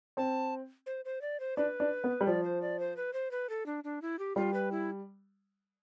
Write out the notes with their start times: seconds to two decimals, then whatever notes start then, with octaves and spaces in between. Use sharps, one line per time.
0.17 C4 A5
0.86 C5
1.05 C5
1.22 D5
1.40 C5
1.57 D4 B4
1.80 D4
2.04 B3
2.21 G3
2.27 F3 D5
2.44 C5
2.62 D5
2.79 C5
2.97 B4
3.13 C5
3.31 B4
3.49 A4
3.66 D4
3.84 D4
4.02 E4
4.19 G4
4.36 G3 F4
4.54 B4
4.72 E4